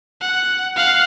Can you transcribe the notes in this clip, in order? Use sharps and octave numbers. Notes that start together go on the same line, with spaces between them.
F#5
F5 F#5